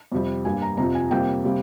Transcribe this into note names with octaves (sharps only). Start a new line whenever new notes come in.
F2 C3 G3
G2 G3 A#3 G#5
A#5
F2 C3 F3 A#5
G#5
F2 C3 G3 A#3 G5
C3 G3 A#3